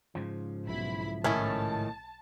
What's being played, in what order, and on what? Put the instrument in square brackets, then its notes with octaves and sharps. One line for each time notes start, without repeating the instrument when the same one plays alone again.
[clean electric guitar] G#2 C#3 F3
[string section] B1 E4 B5
[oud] A2 D#3 [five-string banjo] C#4 E4 [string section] A5